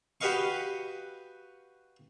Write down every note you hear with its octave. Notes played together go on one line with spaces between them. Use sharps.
F#4 G4 B4 D#5 F5 C#6